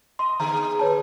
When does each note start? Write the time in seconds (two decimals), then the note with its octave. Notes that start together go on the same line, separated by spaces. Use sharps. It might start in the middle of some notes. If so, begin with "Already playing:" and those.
0.19 D#5 C6
0.40 D3 B3 G#4 A#5
0.79 A#3 B4 C#5 A5